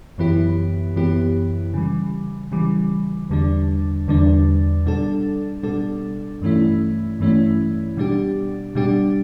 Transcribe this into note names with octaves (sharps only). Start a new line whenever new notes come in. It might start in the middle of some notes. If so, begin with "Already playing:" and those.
F#2 E3 B3 E4 G4
F#2 E3 B3 E4 G4
C#3 E3 G3
C#3 E3 G3
E2 D3 G3 D4
E2 D3 G3 D4
B2 G3 D4 A4
B2 G3 D4 A4
G2 E3 A3 C#4 E4
G2 E3 A3 C#4 E4
B2 G3 D4 G4
B2 G3 D4 G4